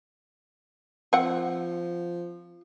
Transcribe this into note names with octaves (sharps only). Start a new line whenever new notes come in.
F3 C4 F#5